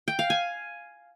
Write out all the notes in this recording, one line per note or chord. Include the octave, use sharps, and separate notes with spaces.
G5
F5
G#5